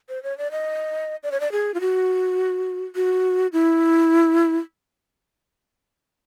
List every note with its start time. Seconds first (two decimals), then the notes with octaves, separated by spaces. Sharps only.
0.09 C5
0.23 C#5
0.38 D5
0.51 D#5
1.23 D5
1.32 C#5
1.40 D5
1.52 G#4
1.74 F4
1.81 F#4
2.96 F#4
3.53 E4